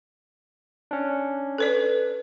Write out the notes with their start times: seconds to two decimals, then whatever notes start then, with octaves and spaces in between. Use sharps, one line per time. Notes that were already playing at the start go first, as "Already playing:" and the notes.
0.91 C#4 D4
1.58 A4 B4 D5